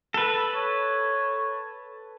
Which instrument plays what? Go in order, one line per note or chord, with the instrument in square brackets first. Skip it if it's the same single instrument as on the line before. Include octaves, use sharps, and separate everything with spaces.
[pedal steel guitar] A4 B4
[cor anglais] C#5